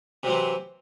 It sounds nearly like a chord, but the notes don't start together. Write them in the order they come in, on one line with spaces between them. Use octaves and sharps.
C3 F#3 C4 E3